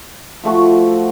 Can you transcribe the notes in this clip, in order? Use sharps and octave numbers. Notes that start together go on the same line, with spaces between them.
F3 A3 F#4